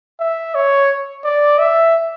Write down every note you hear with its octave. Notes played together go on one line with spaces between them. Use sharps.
E5
C#5
D5
E5